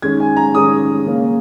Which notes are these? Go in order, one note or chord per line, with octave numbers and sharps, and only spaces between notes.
D#3 G#3 C#4 G#6
G#5
A#5
D#3 G#3 C#4 D#6
C#3 A#3 C#4